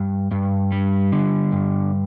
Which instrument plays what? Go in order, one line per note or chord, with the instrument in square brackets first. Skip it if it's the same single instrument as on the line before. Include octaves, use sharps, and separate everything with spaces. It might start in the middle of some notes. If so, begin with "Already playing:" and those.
Already playing: [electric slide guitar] G2
G2
G3
D3
G2